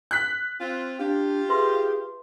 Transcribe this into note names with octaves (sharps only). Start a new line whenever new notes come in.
F#6 B6
C4 F4
D4 F4 G4
G#4 B4 E5 C6